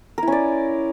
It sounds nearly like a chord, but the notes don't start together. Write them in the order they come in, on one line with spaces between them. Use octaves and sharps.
A#4 E4 C#4 D5